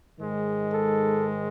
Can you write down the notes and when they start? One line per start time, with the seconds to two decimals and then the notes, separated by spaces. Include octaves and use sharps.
0.19 G#2 D#3 G#3
0.71 A4